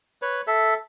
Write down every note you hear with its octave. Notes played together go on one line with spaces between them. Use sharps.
B4 C#5
A4 E5